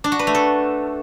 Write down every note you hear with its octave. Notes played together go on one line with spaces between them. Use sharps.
D4
F#4
B4
A3
A4